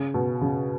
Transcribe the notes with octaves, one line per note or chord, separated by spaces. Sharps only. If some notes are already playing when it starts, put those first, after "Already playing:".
Already playing: C#3
B2
C#3